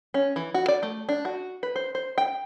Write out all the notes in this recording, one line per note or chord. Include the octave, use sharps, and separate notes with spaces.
C#4
E3
F#4
D5
A3
D4
F#4
B4
C5
C5
G5